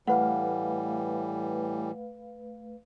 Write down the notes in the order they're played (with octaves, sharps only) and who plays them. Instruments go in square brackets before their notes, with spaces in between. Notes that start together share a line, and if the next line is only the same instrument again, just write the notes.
[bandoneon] A2 E3 G3 [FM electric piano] A3 B4 F5 [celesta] F#5